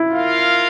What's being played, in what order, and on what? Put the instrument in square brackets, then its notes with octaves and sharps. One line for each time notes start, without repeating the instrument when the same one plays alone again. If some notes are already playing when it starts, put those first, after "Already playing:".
Already playing: [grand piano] E4
[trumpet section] F4 A#4 F5